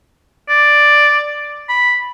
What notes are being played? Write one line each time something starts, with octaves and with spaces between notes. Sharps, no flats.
D5
B5